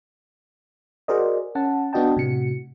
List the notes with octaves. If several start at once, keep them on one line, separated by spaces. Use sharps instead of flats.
F#4 G#4 A#4 C5 D5 D#5
C#4 F#5 A5
B3 D4 F#4 D#5 G5 A5
A2 C3 F#4 C#7